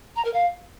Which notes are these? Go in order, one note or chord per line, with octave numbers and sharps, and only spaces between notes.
A#5
A#4
F5